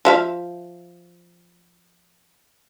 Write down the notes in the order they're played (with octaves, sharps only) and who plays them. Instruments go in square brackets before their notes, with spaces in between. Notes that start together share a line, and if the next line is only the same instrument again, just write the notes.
[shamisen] F3 E5 F5